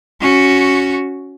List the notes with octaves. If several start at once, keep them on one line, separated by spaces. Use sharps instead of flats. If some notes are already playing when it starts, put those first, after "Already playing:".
C#4 F#4